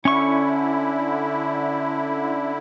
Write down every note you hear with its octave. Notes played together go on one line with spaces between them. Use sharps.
D3 C#4 E4 C#6